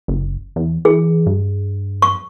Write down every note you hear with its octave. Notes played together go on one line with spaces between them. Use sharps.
F#1
E2
E3 G#4
G2
C#6